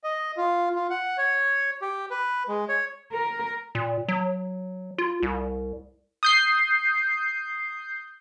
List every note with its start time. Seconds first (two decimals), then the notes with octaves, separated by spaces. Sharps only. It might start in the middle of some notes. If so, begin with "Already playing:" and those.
0.04 D#5
0.37 F4
0.76 F4
0.90 F#5
1.18 C#5
1.82 G4
2.11 B4
2.48 G#3
2.69 C#5
3.12 A#4
3.75 A#2
4.08 F#3
4.98 F4
5.23 C2
6.23 D#6 G6 C7